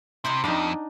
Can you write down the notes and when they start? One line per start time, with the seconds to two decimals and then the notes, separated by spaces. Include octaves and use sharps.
0.24 C3 E4 C5 D#5
0.44 F2 D4 D#4 F5 G5